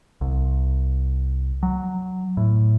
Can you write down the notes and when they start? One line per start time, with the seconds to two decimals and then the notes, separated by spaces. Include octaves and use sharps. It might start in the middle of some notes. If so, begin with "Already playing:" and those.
0.21 C2
1.63 F#3
2.37 A2